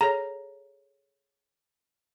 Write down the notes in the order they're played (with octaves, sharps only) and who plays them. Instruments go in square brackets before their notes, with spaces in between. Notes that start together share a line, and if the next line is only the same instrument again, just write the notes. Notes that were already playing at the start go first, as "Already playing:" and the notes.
[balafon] G#4 A4 C#5 [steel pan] A#5